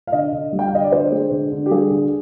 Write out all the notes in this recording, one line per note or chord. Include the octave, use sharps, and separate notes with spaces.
F5
D3 D#5
D3
G3
G5
F5
D3 D#5
D5
D3 C5
G#3
D3
D3
G4
G3 G#4
D3